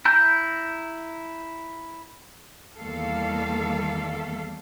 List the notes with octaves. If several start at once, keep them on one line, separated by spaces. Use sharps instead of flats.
E4 A#5 G6
E2 D#3 G3 A#3 A4 F5